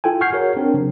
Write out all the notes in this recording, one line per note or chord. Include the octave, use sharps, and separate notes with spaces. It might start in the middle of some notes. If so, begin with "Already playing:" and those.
E4 F4 A4 G5 G#5
F#5 C#6 F6 G6 G#6 C7
F#4 G#4 A#4 C#5
C4 D4 A#4
C#3 F#3